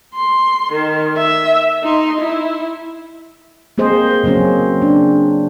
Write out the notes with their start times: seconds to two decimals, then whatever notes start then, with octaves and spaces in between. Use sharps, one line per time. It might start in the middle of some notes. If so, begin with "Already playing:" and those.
0.14 C6
0.72 D#3
1.17 E5
1.83 D#4 C6
2.20 E4
3.78 A#3 C4 G#4 C5 D#5
4.24 C#3 F#3 A#3 C4 C#4
4.82 D4